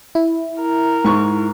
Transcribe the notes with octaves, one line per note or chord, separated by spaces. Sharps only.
E4
A#4
G#2 C#6